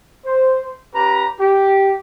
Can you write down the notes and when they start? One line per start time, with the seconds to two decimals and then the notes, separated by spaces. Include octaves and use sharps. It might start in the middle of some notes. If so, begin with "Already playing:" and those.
0.25 C5
0.93 C#4 G4 B4 A#5
1.39 G4